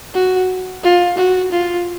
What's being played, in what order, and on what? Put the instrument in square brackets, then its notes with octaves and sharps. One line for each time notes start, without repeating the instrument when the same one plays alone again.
[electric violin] F#4
F4
F#4
F4